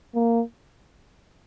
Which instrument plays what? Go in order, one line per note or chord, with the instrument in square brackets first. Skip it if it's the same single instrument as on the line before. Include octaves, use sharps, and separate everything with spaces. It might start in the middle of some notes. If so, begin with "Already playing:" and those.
[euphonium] A#3